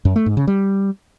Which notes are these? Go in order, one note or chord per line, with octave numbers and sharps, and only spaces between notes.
F#2
A3
G#2
C#3
G3